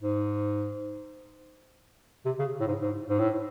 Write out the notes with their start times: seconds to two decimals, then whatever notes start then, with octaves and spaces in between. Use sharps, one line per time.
0.02 G#2
2.26 C3
2.39 C#3
2.61 A2
2.67 G#2
2.82 G#2
3.10 G#2
3.19 A2